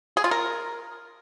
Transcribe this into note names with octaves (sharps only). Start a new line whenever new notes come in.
G#4
F4
A#4